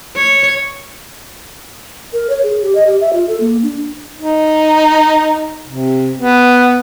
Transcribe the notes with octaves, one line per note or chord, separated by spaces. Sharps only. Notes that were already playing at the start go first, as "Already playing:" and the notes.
C#5
A#4
C#5
G#4
G4
D#5
G4
E5
F4
A4
A#3
D4
D#4
C3
B3